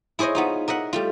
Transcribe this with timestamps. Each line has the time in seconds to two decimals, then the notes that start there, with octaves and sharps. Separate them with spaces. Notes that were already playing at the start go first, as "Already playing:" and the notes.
0.19 E4 G#4 C5 C#5 D#5
0.35 B3 D#4 F4
0.68 A#4 D#5 E5 F#5
0.93 G3 A3 F4